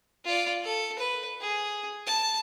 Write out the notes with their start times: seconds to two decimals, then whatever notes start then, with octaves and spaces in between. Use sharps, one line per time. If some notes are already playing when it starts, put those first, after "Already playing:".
0.25 F4 D5
0.64 A4
0.99 B4
1.41 G#4
2.06 A5